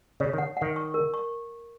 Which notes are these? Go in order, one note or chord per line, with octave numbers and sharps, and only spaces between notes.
C#3 C#5
D#3
F#5
D#3 F#5
C#6
A#4
C#6